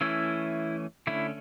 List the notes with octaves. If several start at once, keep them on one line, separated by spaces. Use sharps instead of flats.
E3 A3 C#4 E4
D3 A3 C#4 E4